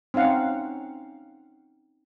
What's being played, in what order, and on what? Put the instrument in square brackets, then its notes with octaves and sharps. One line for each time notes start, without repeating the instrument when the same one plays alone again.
[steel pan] C4 C#4 D#4 F5 F#5